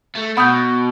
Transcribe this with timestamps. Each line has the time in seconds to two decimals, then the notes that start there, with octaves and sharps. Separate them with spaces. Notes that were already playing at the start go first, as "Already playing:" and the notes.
0.15 A3
0.37 B2 F#5 B5 D#6 G6